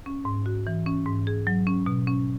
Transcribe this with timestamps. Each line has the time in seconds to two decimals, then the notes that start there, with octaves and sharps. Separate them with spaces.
0.06 C#4
0.25 G#2
0.46 F#4
0.67 E3
0.86 C#4
1.06 G#2
1.27 G#4
1.47 F#3
1.67 C#4
1.86 B2
2.07 C#4